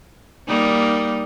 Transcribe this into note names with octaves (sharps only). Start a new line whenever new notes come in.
G3 A#3 D#4